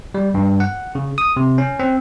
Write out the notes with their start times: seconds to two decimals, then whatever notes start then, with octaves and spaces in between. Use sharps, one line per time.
0.14 G3
0.34 G2
0.60 F#5
0.95 C#3
1.18 D#6
1.37 C3
1.58 C#4
1.79 C4